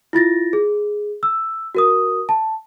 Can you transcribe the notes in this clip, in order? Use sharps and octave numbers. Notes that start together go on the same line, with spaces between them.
E4 F4 A6 A#6
G#4
E6
F#4 A#4 D#6
A5